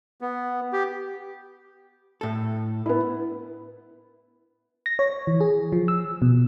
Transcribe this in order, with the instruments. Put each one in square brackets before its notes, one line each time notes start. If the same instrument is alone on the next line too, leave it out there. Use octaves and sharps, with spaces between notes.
[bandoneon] B3
G4
[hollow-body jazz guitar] A2 A4
[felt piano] B3 E4
[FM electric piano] A#6
C#5
E3
G#4
F3
E6
B2